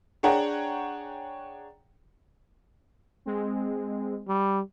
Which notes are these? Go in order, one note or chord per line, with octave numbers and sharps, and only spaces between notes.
D4 G#4 C#5 F#5 G5 A#5
G#3 C4
G3